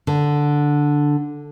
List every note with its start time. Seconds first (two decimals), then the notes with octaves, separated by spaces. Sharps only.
0.07 D3